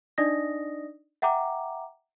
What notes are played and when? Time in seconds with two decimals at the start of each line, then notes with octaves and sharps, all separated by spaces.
0.18 D4 D#4 D5 D#5 D#6 A#6
1.22 E5 F#5 G5 A#5 D6